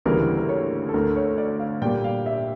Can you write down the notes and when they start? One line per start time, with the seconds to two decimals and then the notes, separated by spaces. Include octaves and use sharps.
0.06 D2 C#3 E3 G3 A#3 A#4
0.38 A#4
0.49 C#5
0.89 A4
0.94 D2 D3 A3 A#4
1.16 C#5
1.38 D5
1.60 F5
1.82 A#2 G3 A#3 G5
2.04 F5
2.26 E5